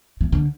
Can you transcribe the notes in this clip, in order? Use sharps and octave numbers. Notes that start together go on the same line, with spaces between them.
E3
D3